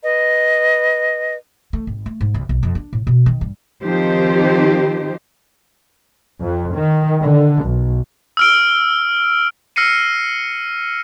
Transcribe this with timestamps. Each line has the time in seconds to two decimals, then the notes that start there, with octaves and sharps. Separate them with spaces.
0.04 B4 D#5
1.73 A3
1.87 G#1
2.06 A3
2.21 G#2
2.34 C2
2.49 B1
2.63 F2
2.75 D4
2.93 A2
3.07 B2
3.26 D#3
3.41 G2
3.83 D#3 F3 C4 D#4 G4 C5
6.42 F2
6.75 D#3
7.22 D3
7.66 B1
8.37 E6 F6 D7
9.76 E6 F6 A#6 C7 C#7 D#7